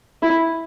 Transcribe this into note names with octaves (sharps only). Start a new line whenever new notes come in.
E4